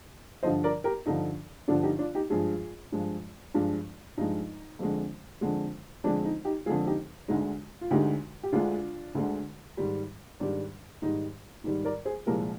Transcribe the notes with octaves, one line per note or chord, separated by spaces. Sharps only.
G2 D3 F3 C5 D#5
A#4 D5
G4 A#4
G2 D3 F3 D#4
G2 D3 F3 D4 F4
D#4 G4
D4 F4
D#4 G4
G2 F3 G#3 F4 G#4
G2 F3 G#3
G2 F3 G#3 D4 F4
G2 F3 G#3 D#4
F2 D3 G#3
F2 D3 G#3
F2 D3 G#3 D4
D#4
D#4 G4
F2 D3 G#3 F4 G#4
D#4 G4
D2 D3 G#3 D#4
F4
D2 D3 G#3 D#4 G4
G4
D2 D3 G#3 D4 F4
D2 D3 G#3
G#2 D#3 G3
G#2 D#3 G3 D4
G#2 D#3 G3 D#4
G#2 D#3 G3
A#4 D5
G#4 C5
C2 A#2 F3 G#3 G4 A#4